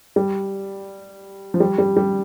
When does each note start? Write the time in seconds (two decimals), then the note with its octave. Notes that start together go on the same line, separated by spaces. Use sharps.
0.16 G3
1.54 F3
1.60 G3
1.78 G3
1.97 G3